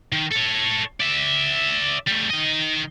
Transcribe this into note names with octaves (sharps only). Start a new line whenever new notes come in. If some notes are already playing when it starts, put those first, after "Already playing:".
D#3
A4 C#5
D5 E5
G3 A3
D#3 D#5